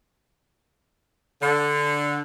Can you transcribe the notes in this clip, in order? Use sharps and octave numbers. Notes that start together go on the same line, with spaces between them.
D3